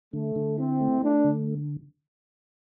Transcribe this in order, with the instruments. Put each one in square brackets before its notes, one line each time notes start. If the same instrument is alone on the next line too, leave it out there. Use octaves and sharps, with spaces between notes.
[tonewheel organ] D3 [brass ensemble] A3
[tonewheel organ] D3
[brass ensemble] C4 [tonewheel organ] E4
[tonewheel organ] A3
[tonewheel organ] A3 [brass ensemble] D4
[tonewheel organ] D3